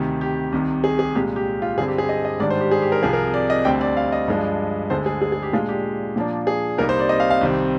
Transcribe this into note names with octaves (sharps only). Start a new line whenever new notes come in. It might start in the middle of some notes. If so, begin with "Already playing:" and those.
Already playing: D2 C3 D#3
G4
C2 C3 D#3
G#4
G#4
C2 A#2 G#3 G4
G4
F4
G2 D3 G3 C4 G#4
G4
G#4
D#5
D#5
G#2 D#3 G3 D4 D5
C5
G4
G#4
G4
A#4
C2 C3 F3 G#4
A#4
D5
D#5
D2 D3 G3 C4 G5
D5
F5
D#5
G2 F3 G#3 D4
D2 D3 G#3 C5
G#4
G#4
G#4
G4
A#2 G#3 D4 F4
G4
A#2 F3 A#3 D4
G#4
C2 C3 G3 A#3 D#4 A#4
C5
D5
D#5
F5
F5
C2 C3 D#3 G3 C4